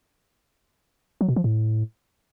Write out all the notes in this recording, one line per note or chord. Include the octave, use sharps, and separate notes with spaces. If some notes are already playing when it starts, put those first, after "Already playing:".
F#3
B2
F3
A2